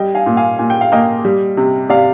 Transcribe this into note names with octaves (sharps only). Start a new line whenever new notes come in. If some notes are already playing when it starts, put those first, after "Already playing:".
Already playing: G3 D#5 G5
F5 G#5
A#2
F5 G#5
A#2 G#5
G5
F5
A#3 D#5 G5
G3
C3
C3 D5 F5